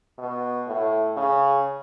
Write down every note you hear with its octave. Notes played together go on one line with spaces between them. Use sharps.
B2
A2
C#3